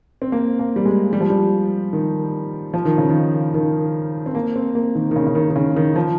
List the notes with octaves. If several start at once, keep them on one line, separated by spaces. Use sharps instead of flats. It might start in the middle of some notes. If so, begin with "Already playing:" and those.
C4
A#3
A#3
G3
G#3
G3
F3
G3
D#3
F3
D#3
C#3
D#3
D#3
C4
A#3
C4
A#3
D#3
D#3
C#3
C#3
D#3
D#3
C#3
D#3
F3